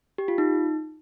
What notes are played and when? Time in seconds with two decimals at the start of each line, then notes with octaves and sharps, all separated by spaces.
0.18 G4
0.28 F4
0.38 D#4